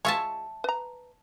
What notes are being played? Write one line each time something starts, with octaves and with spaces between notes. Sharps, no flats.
G#3 F4 C#5 E5 A5
B4 A#5